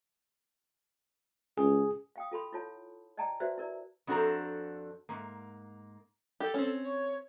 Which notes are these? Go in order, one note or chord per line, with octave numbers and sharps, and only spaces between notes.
C#2 G#4
F5 G5 D#6
F4 A4 B5 C6
E4 F4 C#5 A5
D5 D#5 G5 A5 A#5
F#4 B4 C5 D5 E5
E4 A#4 D5
F2 D4 F#4 A4 C5 A#5
G#2 A#3
G4 A4
C4 C#4
C#5